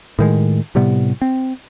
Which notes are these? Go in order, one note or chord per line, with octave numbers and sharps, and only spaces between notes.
A2 D#3 G#3
A2 C3 G3 B3
C4